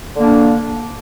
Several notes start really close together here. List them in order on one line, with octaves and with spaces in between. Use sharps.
D3 A#3 D4